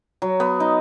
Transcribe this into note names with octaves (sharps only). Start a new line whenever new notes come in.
F#3
B3
D#4